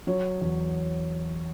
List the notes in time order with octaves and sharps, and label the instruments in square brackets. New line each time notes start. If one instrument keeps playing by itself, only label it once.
[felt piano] F#3 C#5
E2